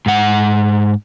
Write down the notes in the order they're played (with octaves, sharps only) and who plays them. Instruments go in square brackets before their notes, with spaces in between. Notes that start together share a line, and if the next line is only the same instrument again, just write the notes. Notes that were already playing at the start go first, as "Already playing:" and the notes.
[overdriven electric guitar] G#2 F#5